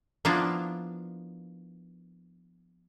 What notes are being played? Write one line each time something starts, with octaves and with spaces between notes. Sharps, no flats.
F3 A#3 B3 D4 E4 F4